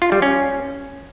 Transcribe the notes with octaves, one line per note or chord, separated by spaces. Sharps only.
F4
G3
C#4